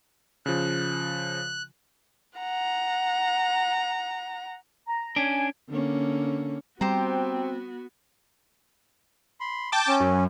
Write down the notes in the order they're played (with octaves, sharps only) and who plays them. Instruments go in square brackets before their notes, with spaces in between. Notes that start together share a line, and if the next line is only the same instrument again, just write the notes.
[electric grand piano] C#3 F3 [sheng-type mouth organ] F#6
[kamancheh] F#5 A#5
[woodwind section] A#5
[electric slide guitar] C#4 D4 [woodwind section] G#5
[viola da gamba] D3 A#3 C#4
[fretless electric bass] G3 [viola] B3 F#4 [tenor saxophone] C4 [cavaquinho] G4 C5 A#5
[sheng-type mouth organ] B5 C6
[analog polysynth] G5 A5 D6
[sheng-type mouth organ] C#4
[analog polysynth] F#2